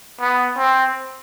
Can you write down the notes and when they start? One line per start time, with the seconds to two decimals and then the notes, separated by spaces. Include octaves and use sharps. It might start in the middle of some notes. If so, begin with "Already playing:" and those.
0.20 B3
0.58 C4